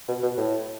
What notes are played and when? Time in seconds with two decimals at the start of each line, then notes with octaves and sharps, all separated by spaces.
0.08 B2
0.23 B2
0.37 A2